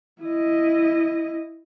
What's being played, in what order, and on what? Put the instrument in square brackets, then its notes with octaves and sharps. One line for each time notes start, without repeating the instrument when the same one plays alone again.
[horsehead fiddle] E4 D#5